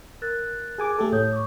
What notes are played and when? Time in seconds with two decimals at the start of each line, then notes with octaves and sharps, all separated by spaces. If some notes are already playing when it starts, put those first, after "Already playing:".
0.22 A#4 F#6 A6
0.78 G#4 G#5 D6
0.99 A3 G4 A4
1.12 A2 C#5 D#6 G6
1.33 C#6 D6